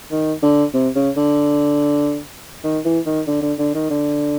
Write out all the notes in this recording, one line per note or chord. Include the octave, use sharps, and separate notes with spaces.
D#3
D3
C3
C#3
D3
D#3
E3
D#3
D3
D3
D3
D#3
D3